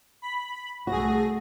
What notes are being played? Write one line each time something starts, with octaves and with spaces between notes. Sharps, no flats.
B5
C2 A3 F#4 G#4 A#6